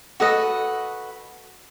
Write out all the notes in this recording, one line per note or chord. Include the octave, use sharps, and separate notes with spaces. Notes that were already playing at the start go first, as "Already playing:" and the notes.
F#4 A4 B4 D#5